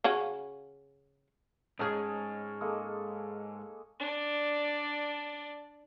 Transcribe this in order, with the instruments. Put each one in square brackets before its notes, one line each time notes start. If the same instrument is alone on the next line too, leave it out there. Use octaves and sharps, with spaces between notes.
[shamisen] C#3 C#4 F#4
[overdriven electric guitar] G#2 [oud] C#4 G#4 [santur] C#5 D#5 [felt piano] A5 F6 G#6
[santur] G#3 A#3 A4
[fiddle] D4 D5